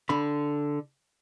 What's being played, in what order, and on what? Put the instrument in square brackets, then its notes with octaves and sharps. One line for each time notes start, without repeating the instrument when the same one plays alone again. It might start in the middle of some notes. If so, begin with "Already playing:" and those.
[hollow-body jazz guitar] D3 B5